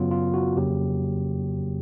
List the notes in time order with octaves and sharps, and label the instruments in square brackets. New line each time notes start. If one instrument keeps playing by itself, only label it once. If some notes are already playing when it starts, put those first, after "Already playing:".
Already playing: [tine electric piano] F#2 C#3 F#3 B3 F4
F4
F#4
F2 C#3 F#3 A#3 G4